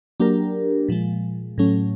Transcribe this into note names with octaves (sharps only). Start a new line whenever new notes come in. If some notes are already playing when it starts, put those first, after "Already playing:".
F#3 A#3 D4 G4 A#4
A#2 F3 G#3
A2 F#3 A3 C#4